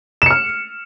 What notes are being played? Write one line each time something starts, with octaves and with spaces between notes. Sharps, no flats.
F6 C#7 E7